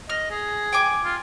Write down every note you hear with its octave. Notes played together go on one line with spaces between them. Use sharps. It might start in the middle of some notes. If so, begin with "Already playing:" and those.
D#5 F6
G#4
G5 G#5 D6
F4